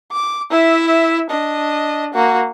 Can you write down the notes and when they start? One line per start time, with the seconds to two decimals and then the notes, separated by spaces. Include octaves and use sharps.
0.12 D6
0.51 E4 E5
1.30 D4 D#5
2.14 A#3 F#4